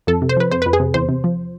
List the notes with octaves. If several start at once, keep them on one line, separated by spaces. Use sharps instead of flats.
F2 A4
C3
C5
F3 B4
F2 C5
F2 B4
G#4
C3
E2 C5
C3
F3